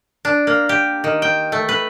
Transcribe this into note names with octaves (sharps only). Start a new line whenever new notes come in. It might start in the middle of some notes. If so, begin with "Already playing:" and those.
D4
A#3
G4
D#3
G5
A3
B4